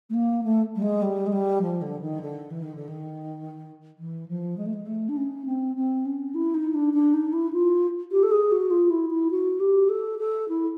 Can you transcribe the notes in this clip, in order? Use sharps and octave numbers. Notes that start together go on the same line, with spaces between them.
A3
A#3
A3
G3
G#3
G3
G#3
G3
F3
D3
D#3
D3
E3
D#3
D3
D#3
E3
F3
G#3
A3
G#3
A3
D4
C#4
C4
C4
C#4
E4
D#4
D4
D4
D#4
E4
F4
G4
A4
G#4
F#4
F4
E4
E4
F#4
G4
A4
A4
E4